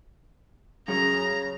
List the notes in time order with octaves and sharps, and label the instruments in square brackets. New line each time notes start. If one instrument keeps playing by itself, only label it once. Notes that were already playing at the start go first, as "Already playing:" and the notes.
[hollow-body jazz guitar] F#2 [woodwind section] C#3 [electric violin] A#5